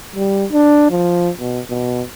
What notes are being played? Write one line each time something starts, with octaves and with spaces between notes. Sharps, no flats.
G3
D4
F3
B2
B2